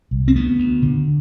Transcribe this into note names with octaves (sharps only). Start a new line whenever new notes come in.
C2
C4
D2 B3
D2
D3